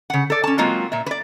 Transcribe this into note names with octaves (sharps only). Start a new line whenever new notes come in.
C#3 F#5
A4 D5
C#4 A5
F#3 G#3 A#3 C4 F4
A#2 E5
B4 D5